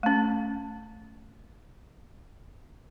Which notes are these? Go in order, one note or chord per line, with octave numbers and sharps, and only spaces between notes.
A3 C#4